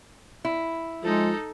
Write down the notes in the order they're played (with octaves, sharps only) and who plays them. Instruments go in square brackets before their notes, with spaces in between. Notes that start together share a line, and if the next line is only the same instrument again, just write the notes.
[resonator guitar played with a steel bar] E4
[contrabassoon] F3 [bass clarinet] G#3 [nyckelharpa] D#4 A4